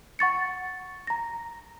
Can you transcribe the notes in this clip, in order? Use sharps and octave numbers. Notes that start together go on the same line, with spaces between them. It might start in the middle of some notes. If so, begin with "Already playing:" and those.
F#5 C#6 A6 C#7
A#5 A#6